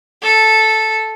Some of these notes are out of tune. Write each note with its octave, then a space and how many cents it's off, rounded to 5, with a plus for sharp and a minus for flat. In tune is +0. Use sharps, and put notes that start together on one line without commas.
A4 -5